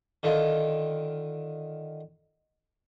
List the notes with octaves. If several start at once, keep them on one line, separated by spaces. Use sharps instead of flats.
D3 D#3 F4